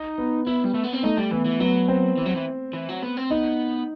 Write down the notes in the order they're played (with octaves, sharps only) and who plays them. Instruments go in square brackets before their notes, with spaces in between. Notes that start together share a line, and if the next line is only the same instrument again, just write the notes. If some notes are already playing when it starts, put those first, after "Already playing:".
Already playing: [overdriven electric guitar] D#4
[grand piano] B3
[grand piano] B3 [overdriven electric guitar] E4
[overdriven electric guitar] G3
A3
B3
C4
[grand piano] A3 [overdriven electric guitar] D#4
[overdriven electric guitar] G3
[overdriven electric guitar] E3 [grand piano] B3
[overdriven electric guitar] E3
[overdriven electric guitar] F#3 [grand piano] B3
[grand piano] C4
[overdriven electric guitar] E3
F#3
E3
E3
F#3
B3
C4
[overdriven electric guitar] B3 [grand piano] D#4